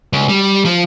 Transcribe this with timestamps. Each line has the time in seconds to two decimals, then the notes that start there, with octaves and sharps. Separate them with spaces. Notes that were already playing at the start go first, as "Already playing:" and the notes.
0.13 C#2
0.29 G3
0.65 F3